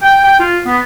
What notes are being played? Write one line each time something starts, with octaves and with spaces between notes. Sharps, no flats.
G5
G5
F4
B3